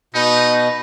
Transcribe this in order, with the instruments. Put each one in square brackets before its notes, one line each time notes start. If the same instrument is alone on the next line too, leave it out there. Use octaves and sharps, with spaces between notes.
[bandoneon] B2 [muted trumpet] D#4 [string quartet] B4